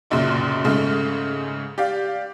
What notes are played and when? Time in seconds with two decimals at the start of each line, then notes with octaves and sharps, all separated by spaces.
0.10 F1 A#1 F#2 A#2 C#3 C6
0.65 G#2 C#3 G#3 A3
1.78 G4 D5 F5